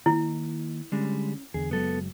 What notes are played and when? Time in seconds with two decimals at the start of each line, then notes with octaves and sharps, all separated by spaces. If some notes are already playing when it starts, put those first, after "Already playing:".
0.06 D#3 A#3 E4
0.92 D3 G3 G#3 C#4
1.54 E2 D3 G#4
1.71 F#1 F#3 G#3 B3 A4